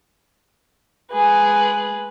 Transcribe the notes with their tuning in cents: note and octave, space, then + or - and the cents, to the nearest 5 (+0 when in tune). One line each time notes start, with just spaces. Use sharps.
G#3 +0 G#4 +0 B4 +0